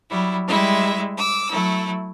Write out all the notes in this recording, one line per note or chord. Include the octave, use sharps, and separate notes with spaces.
F#3 G3 E4
G3 G#3 E4 E5
D6 E6
F#3 A3 E4